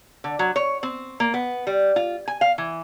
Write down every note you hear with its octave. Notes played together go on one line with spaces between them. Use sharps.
D3
F#3
C#5
C4
A#3
B3
G3
F4
G#5
F5
E3